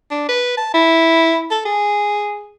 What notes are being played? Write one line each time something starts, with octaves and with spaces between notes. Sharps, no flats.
D4
B4
A5
E4
A4
G#4